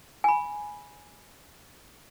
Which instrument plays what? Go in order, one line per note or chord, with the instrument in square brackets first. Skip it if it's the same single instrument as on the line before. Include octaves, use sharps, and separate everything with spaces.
[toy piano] G#5 B5